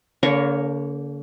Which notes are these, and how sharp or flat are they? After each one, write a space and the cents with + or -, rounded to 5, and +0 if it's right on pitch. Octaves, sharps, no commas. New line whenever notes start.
D3 -45 A#3 +0 C#5 +0